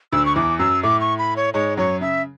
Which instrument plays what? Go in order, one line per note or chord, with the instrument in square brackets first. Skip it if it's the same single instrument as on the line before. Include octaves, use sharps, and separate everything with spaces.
[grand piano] D2 D3 [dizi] E6
[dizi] C#6
[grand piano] E2 E3 [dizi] D6
[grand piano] F#2 F#3 [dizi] E6
[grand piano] A2 A3 [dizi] D6
[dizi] C#6
B5
C#5
[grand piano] G#2 G#3 [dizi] C#5
[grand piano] F#2 F#3 [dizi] C#5
[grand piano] C#3 [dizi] E5